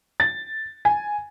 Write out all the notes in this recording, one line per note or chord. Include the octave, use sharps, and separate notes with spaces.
A6
G#5